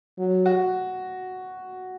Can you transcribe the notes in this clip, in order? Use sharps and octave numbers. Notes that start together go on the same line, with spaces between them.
F#3
F#4